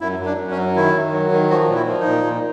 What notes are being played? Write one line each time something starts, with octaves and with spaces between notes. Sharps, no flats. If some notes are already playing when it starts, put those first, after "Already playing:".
F#2 E4
F#2
D4
F#2
C#4
F#3
D#3 E4
D#3
F#3
D#3
F3 F#4
A#2
E4
F3
D#4
A#2
A#2